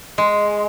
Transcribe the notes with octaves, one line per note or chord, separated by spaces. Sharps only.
G#3